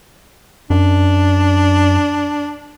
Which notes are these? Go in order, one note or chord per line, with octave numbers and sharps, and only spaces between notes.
F#2 D4